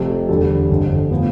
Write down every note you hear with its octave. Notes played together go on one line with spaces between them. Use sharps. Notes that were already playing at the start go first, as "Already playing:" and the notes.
Already playing: F1 F2 C3 A4
E2 D3 G3 A4
G1 F2 D3
A2 F3 B3